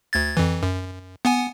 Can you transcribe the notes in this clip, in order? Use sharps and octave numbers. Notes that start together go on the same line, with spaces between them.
D2 G#6 A6
F2 E3
F#2
B3 F#5 G#5